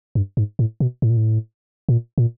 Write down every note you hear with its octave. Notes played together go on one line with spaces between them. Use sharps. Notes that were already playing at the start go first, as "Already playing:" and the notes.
G2
G#2
A2
B2
A2
A#2
A2
A#2
A#2